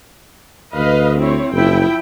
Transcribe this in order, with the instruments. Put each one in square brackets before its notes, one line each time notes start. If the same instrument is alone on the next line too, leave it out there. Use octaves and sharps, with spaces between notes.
[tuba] D2 [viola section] B4 D#5 F5
[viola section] C4 E4 C#5
[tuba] F#1 [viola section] F3 E4 G5